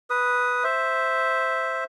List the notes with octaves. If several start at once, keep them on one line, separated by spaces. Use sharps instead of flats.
B4 D#6
C5 E5